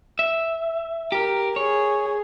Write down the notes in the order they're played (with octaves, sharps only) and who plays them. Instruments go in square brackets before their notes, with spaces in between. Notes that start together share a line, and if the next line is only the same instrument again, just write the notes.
[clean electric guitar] E5
[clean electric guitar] G4 [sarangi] A#4
[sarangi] G#4 [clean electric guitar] C#5